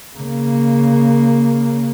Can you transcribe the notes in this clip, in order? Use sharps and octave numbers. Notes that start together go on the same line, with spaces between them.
C#3 A#3